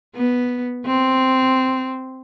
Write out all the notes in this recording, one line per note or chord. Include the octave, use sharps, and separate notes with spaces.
B3
C4